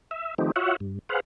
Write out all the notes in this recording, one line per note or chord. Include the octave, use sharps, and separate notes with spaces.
E5
D#3 F3 A3 C4 D#4 G4
F4 F#4 C#5 E5 F#5
G2
G#4 B4 C5 F5 F#5